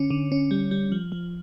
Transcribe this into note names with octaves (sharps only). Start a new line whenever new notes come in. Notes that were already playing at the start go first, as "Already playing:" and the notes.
Already playing: D3 C#4
D3
C#4
G3
G3
F3
F3